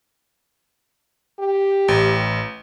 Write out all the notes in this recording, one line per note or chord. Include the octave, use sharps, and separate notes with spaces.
G4
A1